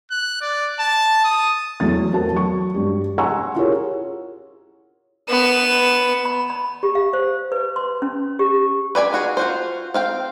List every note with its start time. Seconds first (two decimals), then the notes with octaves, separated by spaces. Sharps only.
0.11 F#6
0.42 D5
0.80 A5
1.25 D#6
1.80 E2 F#3 A3 A6
2.13 C4 F#4 A#4 A5
2.32 F#3 C#6
2.74 G2 G4
3.18 F#5 G#5 A#5 C6 C#6 E6
3.55 E4 F4 G4 G#4 A#4 C#5
5.29 B3 E7
6.25 B5
6.50 B5
6.83 G4
6.95 F5
7.13 C5
7.52 B4
7.76 C6
8.02 C#4
8.39 G4
8.95 B4 D5 G#5 B5
9.13 F4 F#4 G#4
9.37 F4 F#4 C5
9.94 C4 F5 G5